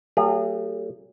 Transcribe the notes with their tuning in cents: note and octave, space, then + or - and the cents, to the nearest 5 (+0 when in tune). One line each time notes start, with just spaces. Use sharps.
F#3 +30 A3 +45 G#4 -40